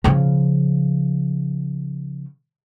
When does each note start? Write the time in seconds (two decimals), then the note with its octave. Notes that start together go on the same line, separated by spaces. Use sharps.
0.04 C#3 F3